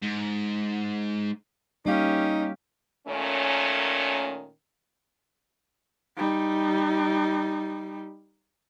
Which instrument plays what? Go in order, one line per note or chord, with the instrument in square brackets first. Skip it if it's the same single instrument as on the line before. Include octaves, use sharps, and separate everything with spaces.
[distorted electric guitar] G#2
[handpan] G3 A#3 F5 [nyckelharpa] C#4 G4 [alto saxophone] D#4
[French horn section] A#2 D#3 A3 C#4
[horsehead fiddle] G3 D#4